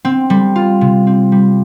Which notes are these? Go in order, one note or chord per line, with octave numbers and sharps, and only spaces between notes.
C4
G3
F4
C3
C4
G3